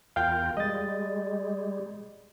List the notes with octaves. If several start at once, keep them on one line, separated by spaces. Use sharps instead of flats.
E2 F4 A#4 F5 G5 G6
G3 G#3 D#5 A6